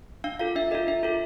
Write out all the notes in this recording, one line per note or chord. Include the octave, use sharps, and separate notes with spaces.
D4 F5
F4 A4 F5
D4 E5
F4 A4 D#5
D4 E5
F4 A4